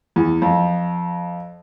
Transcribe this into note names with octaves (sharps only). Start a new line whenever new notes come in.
E2
F2